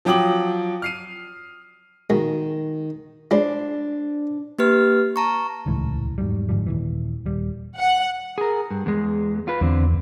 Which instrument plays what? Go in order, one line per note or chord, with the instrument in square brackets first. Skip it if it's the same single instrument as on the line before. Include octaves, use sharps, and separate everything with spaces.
[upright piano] F3 F#3 G5 D6 D#6 F#7
F6 C7 D#7
[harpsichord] B2 G#3 A#3 [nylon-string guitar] D#3
[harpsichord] G#3 E4 [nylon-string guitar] D4 C5 D5
[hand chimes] A#3 G4 B4 F6
A5 A#5 C#6
[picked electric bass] D#1 C#2 A2 E3
E2 G#2 F#3 G3
G1 G#2 F3 G3
D#1 A#1 E3
D#1 G3
[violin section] F#5
[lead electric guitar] G#4 A#4
G2
E2 G#3
F4 B4
[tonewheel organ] E2 [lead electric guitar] D3 C4